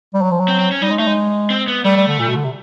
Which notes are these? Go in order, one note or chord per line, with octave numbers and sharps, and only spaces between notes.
G3
F#3
F3
F#3
C4
C4
C#4
G3 D#4
G#3
A3 D#4
G#3
C4
B3
G3 A3
G3
D3
A#2
B2
D3
C3